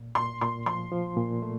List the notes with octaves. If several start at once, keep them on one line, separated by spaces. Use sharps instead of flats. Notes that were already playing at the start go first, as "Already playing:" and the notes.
Already playing: A#2
A#2 C6
A#2 C6
F3 C6
F3
A#2
A3